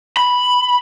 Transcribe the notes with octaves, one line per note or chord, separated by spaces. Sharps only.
B5